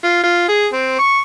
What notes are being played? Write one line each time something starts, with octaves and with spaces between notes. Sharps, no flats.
F4
F4
G#4
C4
C#6